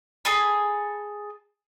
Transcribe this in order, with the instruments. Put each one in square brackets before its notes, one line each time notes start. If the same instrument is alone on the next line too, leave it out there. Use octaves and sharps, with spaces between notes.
[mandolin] G#4 A4 G#5 B5